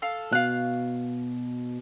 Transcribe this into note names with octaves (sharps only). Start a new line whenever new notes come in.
A4 F5
B2 F5 F#6